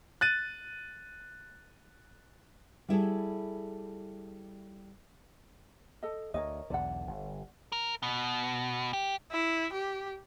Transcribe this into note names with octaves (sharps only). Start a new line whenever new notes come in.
F#6 A6 D#7
G3 E4 G#4 A4
A4 D#5
D2 A#4 C#5 D#5
B1 E2 D3 D5 F#5
G1
A#4
B2
G4
E4
G4